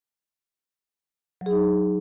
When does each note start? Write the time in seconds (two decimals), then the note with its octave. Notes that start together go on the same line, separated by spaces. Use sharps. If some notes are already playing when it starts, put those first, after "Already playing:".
1.41 F#3
1.46 G#4
1.51 D#4